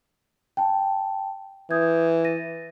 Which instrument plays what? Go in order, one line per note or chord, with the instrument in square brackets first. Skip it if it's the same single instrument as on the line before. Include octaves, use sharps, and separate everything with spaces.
[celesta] G5 A5
[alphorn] E3 [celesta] D#6 G6 G#6
[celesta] A6 A#6 D#7